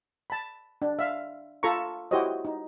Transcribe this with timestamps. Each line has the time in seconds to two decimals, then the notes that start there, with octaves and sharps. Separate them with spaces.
0.30 A5 B5
0.82 D4
0.99 E5 F5
1.63 F4 A4 A#5 B5 C#6
2.11 E4 F#4 G4 C5 C#5 D#5
2.45 D#4